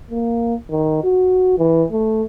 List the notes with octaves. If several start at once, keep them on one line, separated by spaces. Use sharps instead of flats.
A#3
D#3
F#4
E3
A3